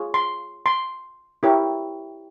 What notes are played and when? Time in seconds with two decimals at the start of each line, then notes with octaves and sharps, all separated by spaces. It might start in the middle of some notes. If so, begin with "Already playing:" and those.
Already playing: F4 G#4 C#5
0.14 C6
0.66 C6
1.43 E4 G4 A#4 C#5